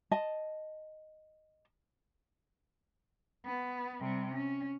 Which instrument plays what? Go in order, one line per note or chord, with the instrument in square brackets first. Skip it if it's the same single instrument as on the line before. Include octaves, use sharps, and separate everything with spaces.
[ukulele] D#5 A5
[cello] B3
C3 G3
C#4